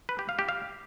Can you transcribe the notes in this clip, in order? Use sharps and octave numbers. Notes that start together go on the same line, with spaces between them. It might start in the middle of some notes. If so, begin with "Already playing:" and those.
B4
G4
F5
G4
F5